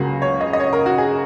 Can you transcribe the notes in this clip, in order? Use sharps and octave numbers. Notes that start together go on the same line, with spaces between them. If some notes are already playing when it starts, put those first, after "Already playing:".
Already playing: C#2 C#3 F#3 A#3 F#4
C#5
D#5
D#5
C#5
A#4
F#4
G#4